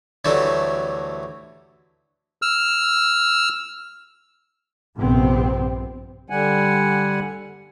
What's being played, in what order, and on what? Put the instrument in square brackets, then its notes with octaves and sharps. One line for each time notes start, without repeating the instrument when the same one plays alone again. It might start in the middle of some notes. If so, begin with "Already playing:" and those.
[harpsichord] D2 E3 F#3 G3 A3 D5
[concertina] E6 F6
[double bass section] A#1 G2 C3 B3 C4
[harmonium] D3 G3 F#5 G#5